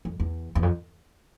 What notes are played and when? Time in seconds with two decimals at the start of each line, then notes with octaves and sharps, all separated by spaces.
0.05 F2
0.20 E2
0.55 E2
0.63 F2